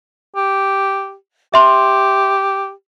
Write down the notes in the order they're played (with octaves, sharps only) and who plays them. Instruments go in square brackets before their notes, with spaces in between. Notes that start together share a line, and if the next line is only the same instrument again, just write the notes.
[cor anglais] G4
[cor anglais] G4 [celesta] E5 C6